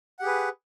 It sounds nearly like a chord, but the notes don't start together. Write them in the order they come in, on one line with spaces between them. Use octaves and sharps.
F#5 G4 G#4 B4